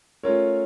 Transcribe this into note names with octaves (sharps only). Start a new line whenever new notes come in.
A3 C#4 F4 A#4 C#5